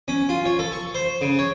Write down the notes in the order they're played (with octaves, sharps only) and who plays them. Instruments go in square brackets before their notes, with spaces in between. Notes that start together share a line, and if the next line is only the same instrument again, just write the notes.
[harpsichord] C#4
F4
C#5
A4
C#6
C5
C#3
C#5